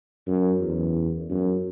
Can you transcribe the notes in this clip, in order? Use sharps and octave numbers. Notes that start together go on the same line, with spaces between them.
F#2
E2
F#2